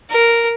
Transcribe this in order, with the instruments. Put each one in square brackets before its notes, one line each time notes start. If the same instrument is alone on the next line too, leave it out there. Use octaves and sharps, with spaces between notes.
[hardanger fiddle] A#4